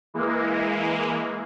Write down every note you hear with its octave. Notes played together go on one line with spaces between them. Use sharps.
E3 G#3 A#3